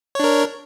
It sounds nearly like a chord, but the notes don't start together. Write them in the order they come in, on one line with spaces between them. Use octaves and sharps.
C#5 D4 A#4